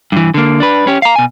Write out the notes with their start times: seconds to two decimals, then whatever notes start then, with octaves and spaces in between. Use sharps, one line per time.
0.12 G2 E3
0.34 D3 A#3
0.60 D4 B4
0.87 C#4 G4
1.02 F5 A#5
1.16 B2 G#5